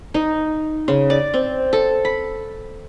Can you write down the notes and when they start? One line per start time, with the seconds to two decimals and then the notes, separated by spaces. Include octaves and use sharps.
0.14 D#4
0.88 C#3
1.10 D5
1.34 C4
1.73 A4
2.05 B5